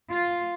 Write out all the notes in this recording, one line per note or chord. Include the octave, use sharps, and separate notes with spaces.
F4